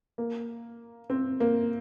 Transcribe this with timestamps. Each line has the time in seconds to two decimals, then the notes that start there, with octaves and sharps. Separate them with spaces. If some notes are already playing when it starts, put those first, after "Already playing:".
0.18 A#3
1.10 C4
1.40 A#3